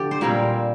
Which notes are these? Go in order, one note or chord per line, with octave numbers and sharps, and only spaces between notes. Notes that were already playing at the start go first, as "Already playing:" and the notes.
Already playing: D3 F3 G4 A4
C5
A#2 G3 C4 A#4